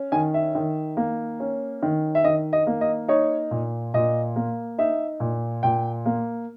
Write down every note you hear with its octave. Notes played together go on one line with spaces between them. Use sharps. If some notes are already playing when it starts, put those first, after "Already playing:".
Already playing: C#4
D#3 G#5
E5
D#3
A#3
C#4
D#3
E5
D#3 D#5
D#5
A#3
D#5
D#4 C#5
A#2
A#2 D#5
A#3
D#4 E5
A#2
A#2 G5
A#3